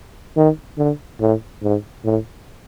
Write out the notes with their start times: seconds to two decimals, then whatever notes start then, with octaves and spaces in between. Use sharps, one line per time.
0.37 D#3
0.78 D3
1.20 A2
1.62 G#2
2.05 A2